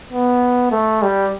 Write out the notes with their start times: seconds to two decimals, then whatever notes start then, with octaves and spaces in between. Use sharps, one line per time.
0.12 B3
0.72 A3
1.03 G3